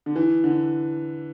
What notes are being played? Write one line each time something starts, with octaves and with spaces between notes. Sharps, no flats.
D3
E3
D3